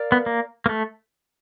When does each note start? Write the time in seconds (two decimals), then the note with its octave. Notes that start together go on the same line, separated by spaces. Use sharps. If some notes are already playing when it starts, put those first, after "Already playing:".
Already playing: A#4 D5 F5
0.12 B3
0.26 A#3
0.66 A#3
0.69 A3